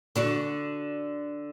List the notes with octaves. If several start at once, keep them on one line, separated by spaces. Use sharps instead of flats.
D3 D4 F#4